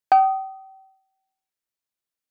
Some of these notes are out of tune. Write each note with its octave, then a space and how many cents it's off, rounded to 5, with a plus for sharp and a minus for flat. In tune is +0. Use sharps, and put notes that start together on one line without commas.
G5 -35 D#6 +0